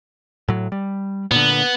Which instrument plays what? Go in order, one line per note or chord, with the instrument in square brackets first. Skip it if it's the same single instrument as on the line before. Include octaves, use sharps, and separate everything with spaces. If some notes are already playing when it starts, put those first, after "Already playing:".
[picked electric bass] A2 F#3
G3
[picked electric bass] A#2 D3 [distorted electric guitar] B3